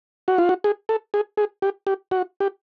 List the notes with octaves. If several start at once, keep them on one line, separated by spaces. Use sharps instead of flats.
F#4
F4
F#4
G#4
A4
G#4
G#4
G4
G4
F#4
G4